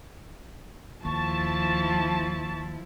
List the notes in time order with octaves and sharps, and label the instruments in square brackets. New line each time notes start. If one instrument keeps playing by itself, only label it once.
[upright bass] D#2 [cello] F3 E4 [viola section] A5 [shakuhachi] C#6